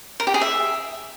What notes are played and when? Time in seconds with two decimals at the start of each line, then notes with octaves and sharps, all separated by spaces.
0.20 A#4
0.27 G4
0.34 G#4
0.41 E5